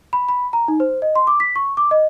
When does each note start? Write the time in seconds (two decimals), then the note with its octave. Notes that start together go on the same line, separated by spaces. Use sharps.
0.13 B5
0.29 B5
0.53 A#5
0.68 D#4
0.80 C5
1.02 D#5
1.16 C6
1.27 D6
1.40 B6
1.56 C#6
1.77 D6
1.91 D#5